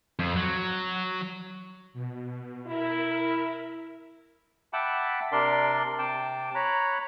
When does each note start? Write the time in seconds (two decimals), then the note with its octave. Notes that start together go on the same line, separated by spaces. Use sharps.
0.19 F2
0.36 F#3
1.94 B2
2.67 E4 A#4 E5
4.73 E5 F#5 G5 A5 B5 D6
5.32 C3 D4 A#4 D5 C6
5.99 C3 G5 A5 D6
6.55 C#5 A#5 B5 F#6